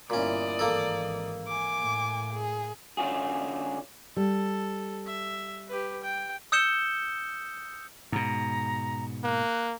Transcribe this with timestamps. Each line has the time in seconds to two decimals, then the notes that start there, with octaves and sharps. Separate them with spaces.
0.10 G1 A#2 C#4 E4 D5 D#6
0.59 G#1 E3 A#3 A4
1.48 G#5 D6
1.78 A2
2.33 G#4
2.97 D3 C#4 F4 F#4 G#4
4.17 G3 A4
5.06 E5
5.68 G4 B4
6.04 G5
6.52 D#6 E6 G6 C#7 E7 G7
8.12 G#2 B2 A#5
9.24 A#3 F#6